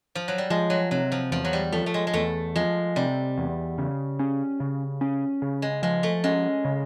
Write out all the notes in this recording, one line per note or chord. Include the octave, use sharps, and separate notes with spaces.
F3
F#3
G3
F3 G#3
F#3
C3 F#3
F3
E2 F3
F#3
G3
F3 A3
A3
G#3
G#3
E2 A3
F3 G#3
C3 G3
E2
C#3
C#4
C#3
C#4
C#3
G#3
F3 G#3
A3
G#3 C#4
C#3